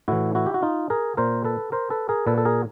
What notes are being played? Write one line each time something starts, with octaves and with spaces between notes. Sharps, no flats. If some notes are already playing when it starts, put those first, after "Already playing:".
A2 E3 E4 F#4
E4 F#4
G4
F#4
D#4 F4
G#4 A#4
A#2 A#4 C5
A4 B4
A#4 C5
A4 B4
G#4 A#4
A#2 A4 B4
A4
G#4 A#4